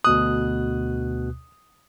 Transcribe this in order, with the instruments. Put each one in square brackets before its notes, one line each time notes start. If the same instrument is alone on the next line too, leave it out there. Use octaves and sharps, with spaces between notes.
[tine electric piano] D2 B2 F#6 [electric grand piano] D#6